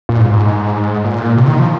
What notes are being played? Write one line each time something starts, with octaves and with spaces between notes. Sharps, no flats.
A#2
G#2
G#2
A#2
C3
D#3
F3